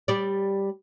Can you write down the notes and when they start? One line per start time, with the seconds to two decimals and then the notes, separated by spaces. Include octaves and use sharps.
0.08 G3 D5